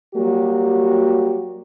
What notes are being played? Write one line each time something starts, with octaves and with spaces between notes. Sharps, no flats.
F#3 G3 A#3 F#4 G4